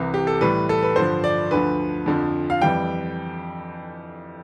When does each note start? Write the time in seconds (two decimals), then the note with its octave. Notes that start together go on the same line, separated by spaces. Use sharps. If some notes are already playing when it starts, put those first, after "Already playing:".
Already playing: C2 C3 E3
0.14 G4
0.27 A4
0.41 A2 E3 G3 B4
0.69 A4
0.83 B4
0.96 G2 D3 F3 C5
1.24 D5
1.51 D2 D3 F3 B4
2.06 F2 D3 F3
2.50 F5
2.61 F2 E3 G3 G5